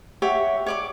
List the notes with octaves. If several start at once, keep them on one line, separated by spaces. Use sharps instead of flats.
G4 C#5 E5 F#5
C#5 D5 D6